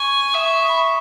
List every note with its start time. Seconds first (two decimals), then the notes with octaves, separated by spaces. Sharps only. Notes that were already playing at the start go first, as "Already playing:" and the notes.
Already playing: G#5 C#6
0.34 E5 D#6
0.46 C#6
0.58 D#6
0.69 B5
0.77 C#6